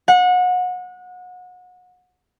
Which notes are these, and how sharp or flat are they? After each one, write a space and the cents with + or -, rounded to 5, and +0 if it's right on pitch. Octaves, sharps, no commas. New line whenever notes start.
F#5 -30